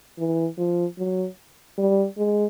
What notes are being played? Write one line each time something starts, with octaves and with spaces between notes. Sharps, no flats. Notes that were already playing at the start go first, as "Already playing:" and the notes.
E3
F3
F#3
G3
G#3